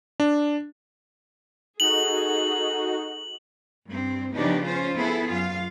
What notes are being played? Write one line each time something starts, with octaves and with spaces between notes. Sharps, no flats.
D4
D#4 F#4 G#4 A4 F#7
G2 C4
C#3 F3 B3 D4 D#4 G4
C#4 F4 C5
B3 E4 G#4 A4
F#2 F4 F5